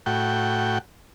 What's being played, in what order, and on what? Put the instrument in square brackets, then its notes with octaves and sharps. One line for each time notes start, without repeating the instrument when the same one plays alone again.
[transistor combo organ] A2 F#4 G5